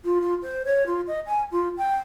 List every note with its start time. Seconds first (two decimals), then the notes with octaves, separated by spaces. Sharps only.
0.05 F4
0.21 F4
0.43 C5
0.65 C#5
0.86 F4
1.07 D#5
1.26 G#5
1.52 F4
1.77 G5